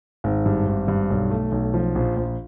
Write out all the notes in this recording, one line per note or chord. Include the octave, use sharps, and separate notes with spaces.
G#1
G2
G#1
G2
B1
A3
B1
F3
A#1
A#1